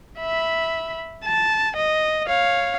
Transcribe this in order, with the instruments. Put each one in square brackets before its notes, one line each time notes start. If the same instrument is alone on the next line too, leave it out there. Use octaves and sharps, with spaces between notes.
[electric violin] E5 B5
A5
D#5
C#5 F5